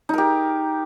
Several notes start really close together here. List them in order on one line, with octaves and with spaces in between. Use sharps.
D#4 A#4 G4